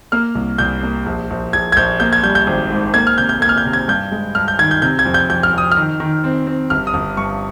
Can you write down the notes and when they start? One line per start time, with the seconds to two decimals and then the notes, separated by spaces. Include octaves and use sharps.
0.12 A#3 F6
0.35 C2
0.58 C2 G6
0.83 A#3
1.06 A#1
1.30 A#1
1.53 A#1 G#6
1.72 G#6
1.76 A#1 G6
2.00 A#3 G6
2.13 G#6
2.23 G3 G6
2.35 G6
2.47 G#1
2.70 G#2
2.94 A#3 G#6
3.07 F6
3.18 C3 G6
3.29 G6
3.41 A#3 G#6
3.49 F6
3.57 G6
3.65 C3
3.73 G#6
3.88 G2 G6
4.12 G#3
4.35 G2 F6
4.48 G6
4.59 D#3 G#6
4.71 G6
4.82 C3 G6
4.99 G#6
5.05 F2
5.14 G6
5.29 F2 G6
5.43 F6
5.53 F2
5.58 D#6
5.71 F6
5.77 D#3
6.00 D#3
6.24 C4
6.47 C4
6.70 G1 F6
6.87 D#6
6.94 G1
7.17 G2 C#6